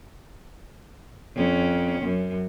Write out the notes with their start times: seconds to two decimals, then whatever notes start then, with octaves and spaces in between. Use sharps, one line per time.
1.35 F2 C#4
2.03 F#2